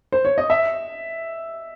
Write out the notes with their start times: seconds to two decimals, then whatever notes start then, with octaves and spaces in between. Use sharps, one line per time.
0.12 C5
0.25 C#5
0.38 D#5
0.50 E5